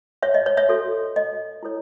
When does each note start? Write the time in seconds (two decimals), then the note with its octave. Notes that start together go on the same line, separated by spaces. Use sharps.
0.23 C#5 E5
0.34 D#5
0.46 C#5
0.57 C#5 E5
0.69 F#4 A4 C#5
1.16 D#5
1.63 E4 A4 C#5